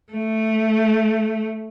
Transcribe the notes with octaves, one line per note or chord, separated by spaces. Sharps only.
A3